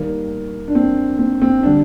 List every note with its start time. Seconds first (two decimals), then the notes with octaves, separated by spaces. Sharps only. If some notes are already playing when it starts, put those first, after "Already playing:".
Already playing: D#2 D#3 G3 A#3
0.68 D4
0.75 C4
1.19 C4
1.42 C4
1.63 D3 G3 D4